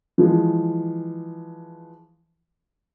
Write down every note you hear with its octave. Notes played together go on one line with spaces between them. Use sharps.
E3 F3 G#3